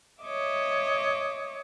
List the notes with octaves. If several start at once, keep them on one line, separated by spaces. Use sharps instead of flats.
C#5 D#5 E5 D6